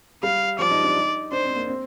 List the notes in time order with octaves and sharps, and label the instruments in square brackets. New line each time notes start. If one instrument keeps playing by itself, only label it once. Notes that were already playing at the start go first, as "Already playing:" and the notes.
[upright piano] G3 [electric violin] F5
[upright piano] F3 [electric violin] D5
[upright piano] D#4
D4
D#4
[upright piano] D4 [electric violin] C5
[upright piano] C4
A#3
C4